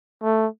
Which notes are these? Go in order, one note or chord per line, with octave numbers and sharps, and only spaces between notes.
A3